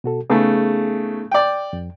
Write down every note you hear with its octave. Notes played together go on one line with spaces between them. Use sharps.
B2 F#4 A4
C#3 A3 B3 D#4 G#4
D5 G5
F2